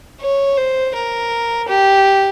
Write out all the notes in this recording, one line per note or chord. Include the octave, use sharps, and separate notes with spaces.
C#5
C5
A#4
G4